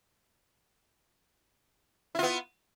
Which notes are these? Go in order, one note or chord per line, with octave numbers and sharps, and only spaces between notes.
B3 E4 F4